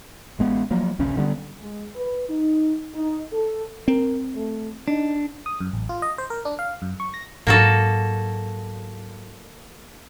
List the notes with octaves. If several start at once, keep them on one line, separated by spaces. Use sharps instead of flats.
A1 G#3 B3
F3 F#3 A#3
A#1 D#2 C#3 C#4
D3 G3 A3 B3
G#3
B4
D#4
D#4
A4
C4 A#4
A3
D4 D#4
D#6
F#2
A1
F4
D#5
C5
A#4
D4
F5
F#2
C#6
A#6
G#2 F#3 A#3 F#4 A4